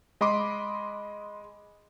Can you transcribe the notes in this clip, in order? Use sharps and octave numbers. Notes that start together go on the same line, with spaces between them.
G#3 D#5 B5 C6 D6